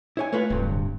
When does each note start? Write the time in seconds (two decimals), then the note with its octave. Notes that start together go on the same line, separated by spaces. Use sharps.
0.17 E4 C#5 G#5
0.32 A3 F4 B4 C#5
0.50 D1 G2 C3